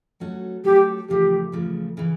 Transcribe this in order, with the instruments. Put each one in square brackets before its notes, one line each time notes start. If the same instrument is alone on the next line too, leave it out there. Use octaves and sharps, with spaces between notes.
[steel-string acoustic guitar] F#3 A3 C#4 F#4 A4
[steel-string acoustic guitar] F#3 A3 C#4 F#4 A4 [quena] G4
[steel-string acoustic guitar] E2 C#3 F3 A3 [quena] G4
[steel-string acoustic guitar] E2 C#3 F3 A3
C#3 E3